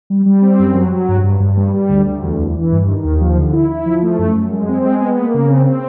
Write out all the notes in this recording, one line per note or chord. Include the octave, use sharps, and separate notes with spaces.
G3
G3
C4
F#2
F#3
F#3
G2
G2
G2
G3
G3
D2
D2
E2
E2
E3
G2
D#3
D#2
F3
D3
E4
E4
F3
A3
F#2
F#2
G#3
C4
G#3
B3
A#3
C#3
C4
C4